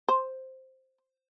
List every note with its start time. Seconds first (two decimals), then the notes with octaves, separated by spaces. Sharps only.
0.09 C5